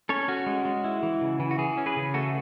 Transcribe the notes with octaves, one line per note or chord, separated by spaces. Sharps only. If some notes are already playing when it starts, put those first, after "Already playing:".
C#4 A4 C#5
C#4 F#4
G#3
G#3
E4
E3
C#3
E3
F#4
E3 G#4
C#4
G#4 B4
C#3
A3 F#4 A4